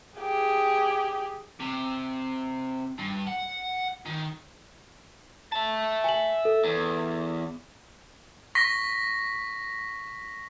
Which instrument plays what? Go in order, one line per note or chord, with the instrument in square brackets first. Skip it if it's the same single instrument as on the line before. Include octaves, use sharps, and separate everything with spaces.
[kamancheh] G4 G#4
[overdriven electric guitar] C3
G2
F#5
D#3
[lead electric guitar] E5 A5
[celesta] G#5 F#7
A4
[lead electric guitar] E2
[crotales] C#6 A#6 B6